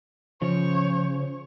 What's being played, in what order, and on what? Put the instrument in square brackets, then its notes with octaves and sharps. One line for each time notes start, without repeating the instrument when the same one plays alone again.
[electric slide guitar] C#3 [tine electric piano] F3 [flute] C5 [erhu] C#5